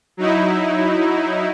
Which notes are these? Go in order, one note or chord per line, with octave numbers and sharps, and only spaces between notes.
F#3 D#4 E4